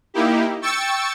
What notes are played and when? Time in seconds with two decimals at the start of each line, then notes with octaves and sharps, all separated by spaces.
0.14 A#3 D#4 E4 G4
0.62 G5 C#6 E6 A6 C#7